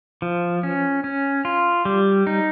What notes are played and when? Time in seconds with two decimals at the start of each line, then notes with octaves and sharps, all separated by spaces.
0.22 F3
0.63 C#4
1.04 C#4
1.45 F4
1.85 G3
2.27 D#4